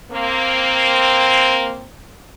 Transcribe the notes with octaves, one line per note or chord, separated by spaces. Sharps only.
A#3 C4